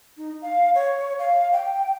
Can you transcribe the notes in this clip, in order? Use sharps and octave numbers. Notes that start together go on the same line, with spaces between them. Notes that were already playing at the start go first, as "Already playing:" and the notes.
D#4
F5
C#5
F5
G5